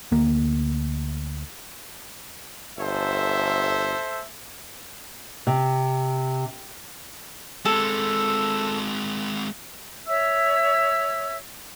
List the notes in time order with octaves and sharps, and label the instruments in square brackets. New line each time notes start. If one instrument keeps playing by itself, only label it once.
[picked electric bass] D2 A#3
[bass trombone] G1 [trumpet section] A4 C5 [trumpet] E5
[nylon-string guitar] C3
[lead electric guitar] G#3 C4 [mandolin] A4
[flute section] C#5 E5 E6